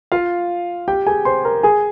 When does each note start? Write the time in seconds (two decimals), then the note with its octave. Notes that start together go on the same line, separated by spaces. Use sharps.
0.12 F4 F5
0.88 G4 G5
1.07 G#4 G#5
1.25 C5 C6
1.45 A#4 A#5
1.63 G#4 G#5